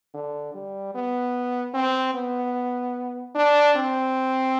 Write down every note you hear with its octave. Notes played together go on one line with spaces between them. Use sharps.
D3
G3
B3
C4
B3
D4
C4